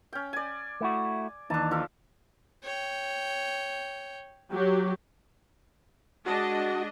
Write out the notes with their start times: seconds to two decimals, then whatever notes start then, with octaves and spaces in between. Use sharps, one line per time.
0.13 C#4 G5
0.33 D5 G#5
0.81 A3 E4 F#4
1.50 D#2 E3 D4 D#4 A5
1.71 F3 A4 F5
2.63 C#5 G5
4.52 F#3 G4
6.26 G#3 D4 F#4 D#5